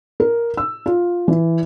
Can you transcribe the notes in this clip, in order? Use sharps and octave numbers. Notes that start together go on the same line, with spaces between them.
A#4
E6
F4
E3